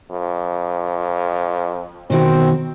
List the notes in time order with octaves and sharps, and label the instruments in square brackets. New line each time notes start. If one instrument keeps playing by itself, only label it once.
[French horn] F2
[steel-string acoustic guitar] B2 D#3 F#4 [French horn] C4